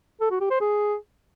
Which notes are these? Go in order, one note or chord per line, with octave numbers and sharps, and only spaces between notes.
A4
F#4
G4
C5
G#4